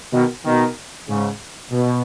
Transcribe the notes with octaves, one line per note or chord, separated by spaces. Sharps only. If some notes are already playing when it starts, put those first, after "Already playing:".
B2 D#3
B2 D#3
G#2 C#3
B2